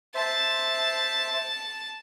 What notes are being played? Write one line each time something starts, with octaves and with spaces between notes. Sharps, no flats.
C5 E5 A5